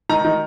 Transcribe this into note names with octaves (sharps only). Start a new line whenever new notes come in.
D#3 A#5
D#3